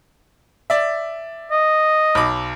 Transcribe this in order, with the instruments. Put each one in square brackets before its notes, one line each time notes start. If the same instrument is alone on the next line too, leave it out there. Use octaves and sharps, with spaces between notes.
[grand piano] D5 E5
[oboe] D#5
[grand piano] B1 B5 D6